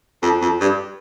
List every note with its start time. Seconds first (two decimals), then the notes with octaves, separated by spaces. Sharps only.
0.22 F2
0.41 F2
0.61 G2